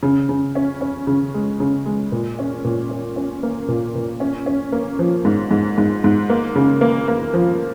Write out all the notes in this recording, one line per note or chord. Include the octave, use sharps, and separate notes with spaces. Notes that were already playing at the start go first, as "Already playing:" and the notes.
C#3
C#3
C#4
C#4
C#3
G#3
C#3
G#3
A#2
C#4
A#2
C#4
C#4
A#3
A#2
A#2
C#4
C#4
A#3
F3
G#2
G#2
G#2
G#2
A#3
C#3
A#3
A#3
F3